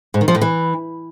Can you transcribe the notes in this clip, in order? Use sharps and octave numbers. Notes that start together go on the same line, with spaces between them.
G#2
D#3
F3
A2
E3